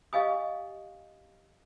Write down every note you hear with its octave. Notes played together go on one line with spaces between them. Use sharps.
G4 D#5 F5 G#5 D#6